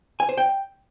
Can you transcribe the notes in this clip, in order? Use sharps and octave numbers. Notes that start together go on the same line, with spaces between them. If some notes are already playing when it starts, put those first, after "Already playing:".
G#5
C5
G5